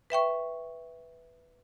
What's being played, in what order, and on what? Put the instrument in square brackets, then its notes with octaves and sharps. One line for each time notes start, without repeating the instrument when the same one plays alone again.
[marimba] B4 E5 G5 C#6